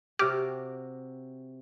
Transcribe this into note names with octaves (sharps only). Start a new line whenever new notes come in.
C3 F#4 G4 D6 F6